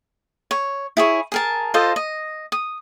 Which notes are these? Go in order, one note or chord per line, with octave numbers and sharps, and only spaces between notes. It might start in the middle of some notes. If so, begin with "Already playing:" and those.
C#5
E4 G#4 C#5
G#4 A#4 A5
F4 A4 C5 D#5
D#5
D#6